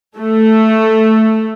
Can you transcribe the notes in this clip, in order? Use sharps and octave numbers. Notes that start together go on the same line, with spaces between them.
A3